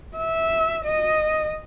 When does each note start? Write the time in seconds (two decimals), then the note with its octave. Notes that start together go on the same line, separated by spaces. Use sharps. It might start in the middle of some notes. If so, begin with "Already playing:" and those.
0.17 E5
0.85 D#5